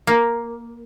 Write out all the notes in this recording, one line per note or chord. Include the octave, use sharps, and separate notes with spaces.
A#3